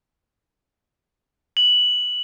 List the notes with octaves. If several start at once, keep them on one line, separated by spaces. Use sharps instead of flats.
F#7